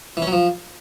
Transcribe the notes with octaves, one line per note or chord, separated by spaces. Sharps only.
E3
C#4
F#3
F3